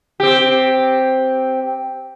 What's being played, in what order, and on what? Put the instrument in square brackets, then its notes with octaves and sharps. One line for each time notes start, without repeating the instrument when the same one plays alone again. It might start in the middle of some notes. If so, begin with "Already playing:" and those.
[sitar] C4 G4